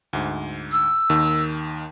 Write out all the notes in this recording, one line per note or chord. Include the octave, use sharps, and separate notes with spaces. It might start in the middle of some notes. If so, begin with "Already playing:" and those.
D2 G#2
E6
D#2 D#3